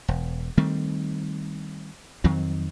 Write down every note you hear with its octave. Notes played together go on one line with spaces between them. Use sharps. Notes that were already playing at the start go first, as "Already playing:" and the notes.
E1
D#3 G3 A3 C4
F2 D#3 F#3 C4